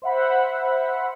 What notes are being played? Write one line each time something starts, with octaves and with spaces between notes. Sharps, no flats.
C5 E5 F#5 B5